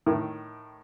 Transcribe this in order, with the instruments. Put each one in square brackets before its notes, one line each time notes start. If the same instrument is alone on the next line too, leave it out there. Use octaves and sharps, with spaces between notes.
[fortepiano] A2 D#3